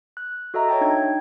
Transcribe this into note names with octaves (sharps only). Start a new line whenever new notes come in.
F#6
F#4 A4 D#5 E5 A#5
C#5 E5 G5 A5
D4 D#4 G5 G#6